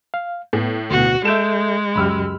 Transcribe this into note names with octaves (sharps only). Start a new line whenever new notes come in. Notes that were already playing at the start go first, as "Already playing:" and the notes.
F5
A2 B3
D2 B2 F#4
G#3 A4 E5 G6 D7 E7
C#2 F#2 G4 B5 E6 F6